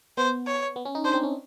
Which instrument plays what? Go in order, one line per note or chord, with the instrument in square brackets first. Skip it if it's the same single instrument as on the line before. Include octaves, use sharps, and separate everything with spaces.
[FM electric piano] B3 [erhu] C5
[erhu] C#5
[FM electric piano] B3
C#4
D#4
[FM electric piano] D4 [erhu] C5
[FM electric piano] C4
C#4